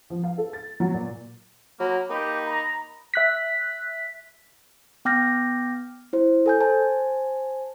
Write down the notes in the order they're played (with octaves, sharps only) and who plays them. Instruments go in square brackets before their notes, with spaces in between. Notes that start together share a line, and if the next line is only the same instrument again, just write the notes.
[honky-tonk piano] F3
F5
A4
A6
F#3
A#2
[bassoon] F#3 [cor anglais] A#3 [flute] B5
[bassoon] A#3 [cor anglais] D#4 [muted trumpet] G4 [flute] B5
[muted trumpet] A#5
[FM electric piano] E5 F#6 B6
[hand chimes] B3 G5 D6 F6 G6 A#6
E4 C5
A4 G#5 G6
C5 G#5 A5